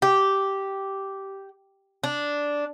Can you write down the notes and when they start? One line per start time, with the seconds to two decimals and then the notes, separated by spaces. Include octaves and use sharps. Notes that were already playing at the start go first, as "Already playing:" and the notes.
0.02 G4
2.04 D4